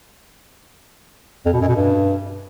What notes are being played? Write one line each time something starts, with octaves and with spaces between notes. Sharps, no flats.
F2
B2
F#2
B2
G2